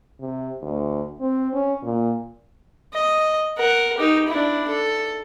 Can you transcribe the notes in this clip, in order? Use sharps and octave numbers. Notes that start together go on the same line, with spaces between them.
C3
D2
C4
C#4
A#2
D#5
A#4 F#5
D#4 G4
D4 E4
A4